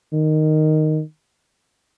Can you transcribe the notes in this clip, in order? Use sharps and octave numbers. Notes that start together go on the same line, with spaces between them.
D#3